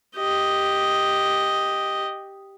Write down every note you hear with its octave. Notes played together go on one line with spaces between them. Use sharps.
G4 D#5